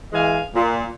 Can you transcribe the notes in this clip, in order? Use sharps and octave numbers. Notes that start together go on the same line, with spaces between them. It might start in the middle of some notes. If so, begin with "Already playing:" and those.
E3 G#3 F5 G#5
A#2